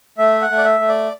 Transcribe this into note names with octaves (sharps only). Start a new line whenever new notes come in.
A3 E5
F#5
A3
D5
E5
A3
D5